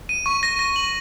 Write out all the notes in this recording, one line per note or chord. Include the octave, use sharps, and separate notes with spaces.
D#7
C#6
A#6
A#6
F#7